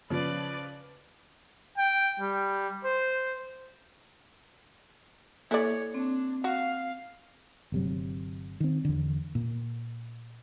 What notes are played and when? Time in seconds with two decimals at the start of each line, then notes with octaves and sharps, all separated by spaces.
0.10 C#3 F3 B4 D5
1.78 G5
2.20 G3
2.85 C5
5.51 A#3 E4 A4 C#5 D5
5.94 C4 D4
6.44 F#4 F5
7.72 G1 C3 F#3
8.60 D#3 C4
8.85 E2 D3
9.35 A#2